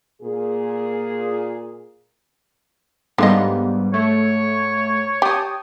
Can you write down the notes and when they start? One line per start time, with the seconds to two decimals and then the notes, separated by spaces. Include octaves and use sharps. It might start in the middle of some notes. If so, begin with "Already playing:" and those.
0.22 A#2 G#4
3.18 G#2 D3 G3 B3 F4 D#5
3.94 A3 C#5
5.22 G4 G5 A5 D#6